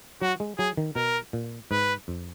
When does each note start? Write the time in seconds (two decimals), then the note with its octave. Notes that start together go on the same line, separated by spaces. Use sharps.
0.22 F#3 F#4
0.40 G#3
0.58 F#3 G#4
0.77 D#3
0.96 B2 A#4
1.33 A#2
1.71 G#2 B4
2.08 F2